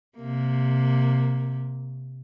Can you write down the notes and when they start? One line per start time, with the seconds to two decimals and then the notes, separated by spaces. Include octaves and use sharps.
0.17 C3 A#3